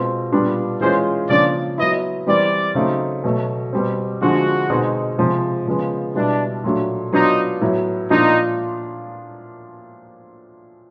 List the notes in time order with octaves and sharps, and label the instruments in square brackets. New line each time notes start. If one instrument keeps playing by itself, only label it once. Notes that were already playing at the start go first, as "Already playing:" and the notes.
Already playing: [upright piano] B2 G#3 C4 F4
A#2 G3 B3 D4 F4
[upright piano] E3 G#3 C#4 F4 [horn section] C5
[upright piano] C#3 F3 A#3 D4 [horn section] D5
[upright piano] F#3 B3 E4 [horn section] D#5
[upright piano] E3 G3 C4 [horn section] D5
[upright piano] C#3 F#3 A3 C4 D#4
B2 F#3 A3
B2 G3 C4
[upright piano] D3 F3 G#3 C4 [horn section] F#4
[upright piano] B2 G#3 C4 D#4
C3 F3 G#3
C#3 F3 G#3 B3
[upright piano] B2 G3 B3 E4 [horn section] D4
[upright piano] A#2 F#3 A3 D4
[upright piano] F#3 B3 D4 F4 [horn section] D#4
[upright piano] A2 F#3 B3 E4
[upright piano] A#2 F3 A#3 D4 F4 [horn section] D#4